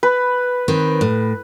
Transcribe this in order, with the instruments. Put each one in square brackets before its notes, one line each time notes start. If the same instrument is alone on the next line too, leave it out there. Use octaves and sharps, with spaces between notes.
[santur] B4
[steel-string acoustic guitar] D#3 C4
A2